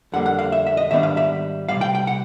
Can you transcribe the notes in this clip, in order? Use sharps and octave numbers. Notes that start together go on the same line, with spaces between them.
F2 D3 G3 A#3 F#5
F#5
F5
E5
E5
D#5
G#2 D#3 G3 B3 D4 E5
F5
E5
C2 B2 G3 F5
G5
G5
F#5